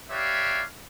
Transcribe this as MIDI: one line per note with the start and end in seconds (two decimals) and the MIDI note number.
0.10 0.62 67
0.10 0.62 71
0.10 0.62 73
0.10 0.62 74
0.10 0.62 76
0.10 0.62 77